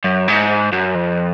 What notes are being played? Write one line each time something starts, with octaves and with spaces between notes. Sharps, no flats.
F#2
G#2
F#2
F2